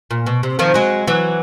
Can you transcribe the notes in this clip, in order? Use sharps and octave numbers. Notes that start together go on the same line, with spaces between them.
A#2
B2
C3
D#3 F3
F#3 G#3
E3 F#3